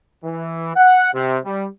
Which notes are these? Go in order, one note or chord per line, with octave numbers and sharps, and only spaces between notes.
E3
F#5
C3
G3